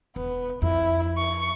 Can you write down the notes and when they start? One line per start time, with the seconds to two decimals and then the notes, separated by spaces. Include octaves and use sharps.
0.16 E1 B3
0.62 F2 E4
1.17 C#6